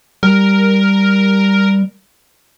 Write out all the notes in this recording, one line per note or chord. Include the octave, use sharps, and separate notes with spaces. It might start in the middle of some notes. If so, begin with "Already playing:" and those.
G3 A#4